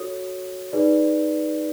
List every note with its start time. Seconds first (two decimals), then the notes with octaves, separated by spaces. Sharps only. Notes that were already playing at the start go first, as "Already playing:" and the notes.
Already playing: F#4 A4 C#5 D#6
0.72 D#4 G#4 B4 D5